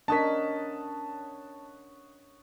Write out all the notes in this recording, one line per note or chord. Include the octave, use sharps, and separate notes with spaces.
C#4 D4 A#4 C#5 D#5 F#5 A5 B6